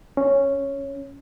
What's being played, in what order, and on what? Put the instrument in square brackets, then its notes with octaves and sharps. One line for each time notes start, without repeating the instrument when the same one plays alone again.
[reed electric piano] C#4